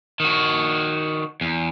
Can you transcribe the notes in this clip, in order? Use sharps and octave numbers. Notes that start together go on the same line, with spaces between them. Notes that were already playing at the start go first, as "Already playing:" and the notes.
D#3 F#4
E2